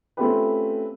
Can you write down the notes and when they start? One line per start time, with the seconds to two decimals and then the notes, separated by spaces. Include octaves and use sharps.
0.17 A3 C4 C#4 F4 G4 B4